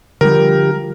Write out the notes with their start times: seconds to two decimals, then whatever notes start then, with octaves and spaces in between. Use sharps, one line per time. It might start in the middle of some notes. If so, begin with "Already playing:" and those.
0.21 D3 F3 G3 G4 A#4